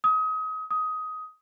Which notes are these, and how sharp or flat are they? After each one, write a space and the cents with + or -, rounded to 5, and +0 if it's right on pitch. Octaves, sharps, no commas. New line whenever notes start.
D#6 +30
D#6 +15